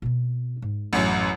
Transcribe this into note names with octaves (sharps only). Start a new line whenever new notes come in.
B2 C4
G#2
A1 F#2